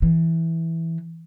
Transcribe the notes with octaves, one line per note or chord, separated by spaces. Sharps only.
E3